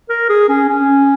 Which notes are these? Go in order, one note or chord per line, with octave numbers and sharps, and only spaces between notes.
A#4
G#4
C#4
C#4